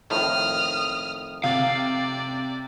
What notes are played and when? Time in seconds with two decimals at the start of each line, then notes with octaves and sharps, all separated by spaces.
0.10 F2 A2 D#3 D#6 F6
1.44 C3 D5 F5